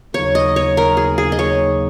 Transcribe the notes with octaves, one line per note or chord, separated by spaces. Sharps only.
D#2 C#3 F#3 A#3 D#4 C#5
D#5
C#5
A#4
G#4
G#4
D#5
C#5